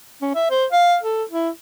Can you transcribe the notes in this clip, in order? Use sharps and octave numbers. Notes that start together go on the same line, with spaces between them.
C#4
E5
C5
F5
A4
E4